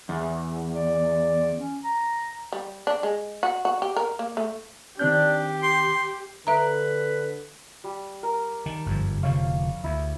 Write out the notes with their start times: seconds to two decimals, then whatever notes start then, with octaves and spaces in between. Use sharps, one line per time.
0.09 E2
0.75 D5
1.58 C#4
1.84 A#5
2.53 G3
2.87 D4
3.03 G#3
3.43 F#4
3.65 F#4
3.82 G4
3.97 A#4
4.19 A#3
4.37 A3
4.99 D#3 C4 D4 G4 G6
5.63 C6
6.47 D3 B4 E5 A#5
7.84 G3
8.23 A#4
8.66 D#3 A5
8.86 G1 F#2 F3
9.23 F1 D3 F3 C#5 F5
9.84 D2 E4